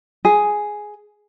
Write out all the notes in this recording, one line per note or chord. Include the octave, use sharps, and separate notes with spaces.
G#4